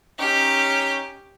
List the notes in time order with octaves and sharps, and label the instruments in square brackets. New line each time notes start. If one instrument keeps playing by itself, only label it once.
[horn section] C#4 D#4 [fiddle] G4